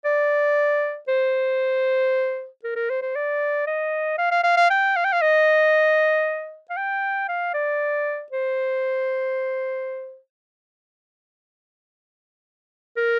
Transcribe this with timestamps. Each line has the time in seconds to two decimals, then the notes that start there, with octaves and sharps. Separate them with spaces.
0.05 D5
1.08 C5
2.64 A#4
2.76 A#4
2.90 C5
3.02 C5
3.16 D5
3.67 D#5
4.18 F5
4.31 F5
4.44 F5
4.57 F5
4.70 G5
4.96 F5
5.05 G5
5.13 F5
5.21 D#5
6.70 F5
6.77 G5
7.28 F5
7.54 D5
8.32 C5
12.97 A#4